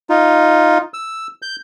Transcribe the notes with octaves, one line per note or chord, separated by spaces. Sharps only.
D#4 F4
E6
G6